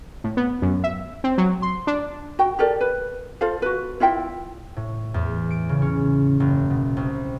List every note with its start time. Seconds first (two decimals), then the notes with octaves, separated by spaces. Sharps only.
0.24 A2
0.37 B3
0.62 F#2
0.84 E5
1.24 C4
1.38 F#3
1.62 C6
1.87 D4
2.39 F#4 G5
2.59 G4 A4 A#4 D5
2.81 B4
3.41 F4 A4 C5 F5
3.62 F#4 B4
4.00 E4 F4 E5 G5
4.77 A2
5.14 E2
5.50 D7
5.69 C#3
5.82 C#4
6.40 F#1
6.70 B2
6.97 C2